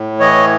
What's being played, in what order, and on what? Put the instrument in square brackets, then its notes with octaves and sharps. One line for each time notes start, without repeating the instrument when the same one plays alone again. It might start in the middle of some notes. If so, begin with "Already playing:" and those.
Already playing: [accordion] A2
E3 C#5 D#5